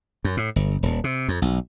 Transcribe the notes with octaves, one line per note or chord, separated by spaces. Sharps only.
F#2
A2
G1
D#1
C3
F2
B1